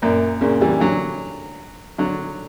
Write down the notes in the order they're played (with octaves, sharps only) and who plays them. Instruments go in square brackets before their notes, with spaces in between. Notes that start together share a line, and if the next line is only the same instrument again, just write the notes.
[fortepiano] F#2 A#2
A#2 C#3
E3 G3
D3 F#3
D3 F#3